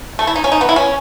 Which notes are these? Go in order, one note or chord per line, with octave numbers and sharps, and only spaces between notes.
A3
E4
D#4
C#4
D#4
B3
E4
C#4